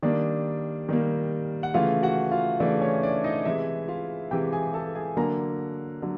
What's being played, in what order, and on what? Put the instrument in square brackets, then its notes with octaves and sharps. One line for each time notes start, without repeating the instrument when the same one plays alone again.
[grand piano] D#3 G3 A#3 D4 D5
D#3 G3 A#3
F#5
C#3 E3 A3 F4 F5
F#4 F#5
F4 F5
C#3 E3 A3 D4 D5
C#4 C#5
D4 D5
D#4 D#5
C3 E3 G#3 E4 E5
F4 F5
C3 E3 G#3 G4 G5
G#4 G#5
A4 A5
G#4 G#5
D3 F#3 A#3 A#4 A#5
D3 F#3